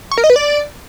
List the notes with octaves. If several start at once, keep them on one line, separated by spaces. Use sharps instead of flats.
C#6
A#4
D#5
B4
D5